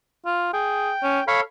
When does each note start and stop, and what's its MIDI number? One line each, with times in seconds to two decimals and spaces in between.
0.26 0.49 65
0.53 0.92 68
0.53 1.24 79
1.03 1.20 61
1.28 1.42 69
1.28 1.41 73
1.28 1.41 77
1.28 1.41 83